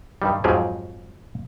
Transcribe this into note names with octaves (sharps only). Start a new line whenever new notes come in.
G2 D#3 G3
F2 G#2 F3 F#3 G4 G#4